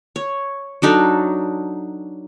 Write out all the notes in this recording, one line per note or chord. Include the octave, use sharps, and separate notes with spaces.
C#5
F#3 D4 D#4 A4